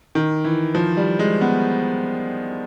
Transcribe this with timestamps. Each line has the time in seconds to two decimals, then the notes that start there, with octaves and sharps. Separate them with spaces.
0.15 D#3
0.44 E3
0.75 F3
0.97 G3
1.19 G#3
1.41 B3